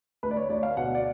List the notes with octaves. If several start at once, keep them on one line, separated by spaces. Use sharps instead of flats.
D2 B4
D5
C#5
D2 D5
F5
B2 F#5
D5